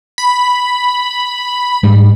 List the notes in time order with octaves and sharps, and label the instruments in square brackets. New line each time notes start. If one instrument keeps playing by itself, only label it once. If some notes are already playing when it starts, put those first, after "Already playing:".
[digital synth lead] B5
[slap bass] G#2 G3